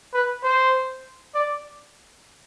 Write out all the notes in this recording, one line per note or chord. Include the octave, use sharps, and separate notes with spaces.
B4
C5
D5